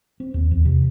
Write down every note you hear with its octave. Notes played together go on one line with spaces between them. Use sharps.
C4
D#2
E2
C3